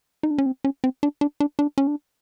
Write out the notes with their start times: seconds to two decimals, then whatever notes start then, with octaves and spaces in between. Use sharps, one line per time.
0.23 D#4
0.31 D4
0.38 C#4
0.46 C4
0.64 C#4
0.84 C4
1.03 D4
1.21 D4
1.40 D4
1.59 D4
1.78 C#4
1.87 D4